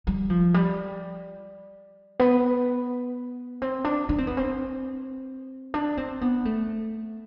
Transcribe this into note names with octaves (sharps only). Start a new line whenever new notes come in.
G3
F3
G3
B3
C4
D4
D4
C4
B3
C4
D4
C4
B3
A3